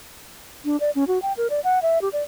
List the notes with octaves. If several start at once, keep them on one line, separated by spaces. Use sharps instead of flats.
D4
D5
C#4
F#4
G5
A#4
D5
F#5
E5
G4
D5